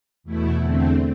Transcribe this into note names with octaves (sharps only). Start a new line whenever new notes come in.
E2 B2 A3 E4
E2 D3 A3 C4